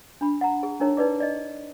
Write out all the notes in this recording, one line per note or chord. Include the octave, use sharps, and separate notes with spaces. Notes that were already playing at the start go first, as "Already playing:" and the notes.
D4 B5
F#5 A#5
G#4
D4 D#4 A#4 C#5 A#5
D#4 B4 D5 D6
D5 D#5